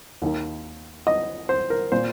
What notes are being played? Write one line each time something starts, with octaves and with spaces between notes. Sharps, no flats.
D#2 D#3
D#5
C5
A#4
A#2 C5